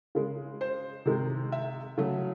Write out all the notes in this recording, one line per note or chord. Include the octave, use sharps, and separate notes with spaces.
C#3 G#3
C5
C3 D#3 G#3
E5
C#3 F#3 A3